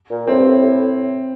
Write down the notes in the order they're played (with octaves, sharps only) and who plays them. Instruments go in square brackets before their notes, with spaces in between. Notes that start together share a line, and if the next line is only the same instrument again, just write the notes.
[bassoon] A#2
[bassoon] A2 [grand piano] C4
[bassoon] G2
A2
A2